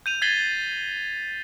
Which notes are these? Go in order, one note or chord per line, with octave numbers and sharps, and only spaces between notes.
G6 D#7 F7
G#6 A6 B6 C7 F#7 G7